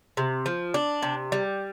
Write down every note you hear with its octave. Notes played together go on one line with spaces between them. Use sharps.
C3
F3
D4
C3
G3